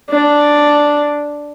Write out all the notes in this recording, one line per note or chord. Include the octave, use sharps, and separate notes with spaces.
D4